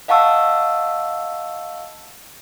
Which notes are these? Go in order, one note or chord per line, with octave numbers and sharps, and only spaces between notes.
D#5 F5 F#5 A5 C#6 E6